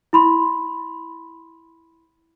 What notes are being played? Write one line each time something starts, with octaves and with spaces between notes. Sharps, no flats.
E4 B5 C6